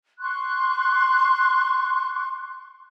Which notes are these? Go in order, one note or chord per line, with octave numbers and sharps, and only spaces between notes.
C6 C#6 F#6